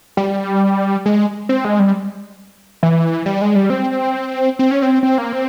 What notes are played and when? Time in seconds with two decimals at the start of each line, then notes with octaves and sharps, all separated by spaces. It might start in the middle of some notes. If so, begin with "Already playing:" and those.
0.17 G3
1.06 G#3
1.49 C4
1.65 G#3
1.79 G3
2.83 E3
3.26 G3
3.41 G#3
3.56 G3
3.70 C4
4.59 C4
4.71 C#4
4.82 C4
5.03 C4
5.18 A#3
5.32 C4